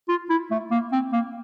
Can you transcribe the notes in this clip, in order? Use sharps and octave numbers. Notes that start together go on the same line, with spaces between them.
F4
E4
A3
A#3
C4
A#3